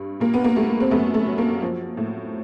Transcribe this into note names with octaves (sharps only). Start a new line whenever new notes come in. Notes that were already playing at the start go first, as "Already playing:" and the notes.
Already playing: G2
A#2 A#3
B3
A#3
G3 A3
C4
F#2 A3 B3
A3
F#3
A#3
F3
A2